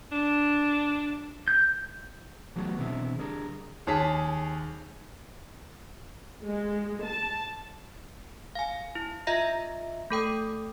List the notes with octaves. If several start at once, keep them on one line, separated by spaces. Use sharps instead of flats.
D4
G6
E3 F#3 A3 B3 F#4 G#4
B2 D3 E3 C4 E4 G#4
D3 G3 G#4 A#4
D#2 G#4 C#5 A5 B6
G#3
A5
F5 G#5
E4
F4 D#5 E5 A#5 A#6
A3 A4 G5 D#6